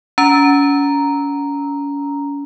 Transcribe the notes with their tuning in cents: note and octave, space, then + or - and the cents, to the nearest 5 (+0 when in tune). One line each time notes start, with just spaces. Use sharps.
C#4 +35 A#5 +0